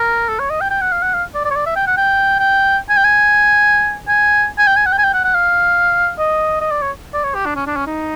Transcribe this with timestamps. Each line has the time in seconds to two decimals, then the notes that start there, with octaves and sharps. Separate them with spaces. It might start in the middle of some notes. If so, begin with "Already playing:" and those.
Already playing: A#4
0.29 A4
0.39 C#5
0.50 D#5
0.61 G5
0.71 G5
0.81 F#5
0.92 F5
1.02 F#5
1.14 F5
1.35 D5
1.45 D5
1.51 C#5
1.55 D5
1.66 E5
1.76 G5
1.87 F#5
1.97 G5
2.39 G5
2.89 G#5
2.97 G5
3.04 G#5
4.08 G#5
4.58 G#5
4.67 G5
4.76 G#5
4.86 F#5
4.92 G5
4.98 G#5
5.03 G5
5.14 F#5
5.24 F#5
5.34 F5
6.19 D#5
6.61 D#5
6.71 D5
6.82 C#5
7.14 D5
7.24 C#5
7.35 G4
7.46 D4
7.56 C#4
7.67 D4
7.76 C#4
7.87 D#4